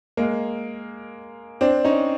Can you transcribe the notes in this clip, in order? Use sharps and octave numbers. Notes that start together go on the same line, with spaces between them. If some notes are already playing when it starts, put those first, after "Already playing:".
G#3 A#3
C4 D4
C#4 D#4